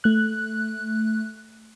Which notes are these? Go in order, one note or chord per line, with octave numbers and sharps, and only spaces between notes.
A3 F#6